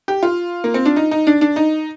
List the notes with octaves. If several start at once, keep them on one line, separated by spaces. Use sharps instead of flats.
G4
F4
A#3
C4
D4
D#4
D#4
D4
D4
D#4